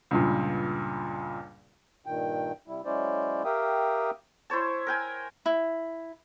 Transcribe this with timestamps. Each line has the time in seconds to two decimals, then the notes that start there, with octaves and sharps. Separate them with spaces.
0.11 C#2 G2 A#2
2.06 G2 A#2 D#3 G5
2.68 C3 G3 E4
2.85 F#3 G#3 C#4 E4 C5 D5
3.45 G4 A#4 E5 F5 G5 D#6
4.50 E4 C5 C#5 A5
4.87 A#4 G5 G#5
5.46 E4